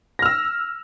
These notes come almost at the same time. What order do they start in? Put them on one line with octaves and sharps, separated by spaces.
A#6 F6 E6